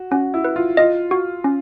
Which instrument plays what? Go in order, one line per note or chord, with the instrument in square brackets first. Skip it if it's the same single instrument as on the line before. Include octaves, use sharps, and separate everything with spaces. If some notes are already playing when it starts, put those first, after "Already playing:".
Already playing: [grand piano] F#4
[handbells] C#4 [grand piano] F#4
[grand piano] E4
[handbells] B4
[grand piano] F4
[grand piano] F4 [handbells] D#5
[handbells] F#4
C#4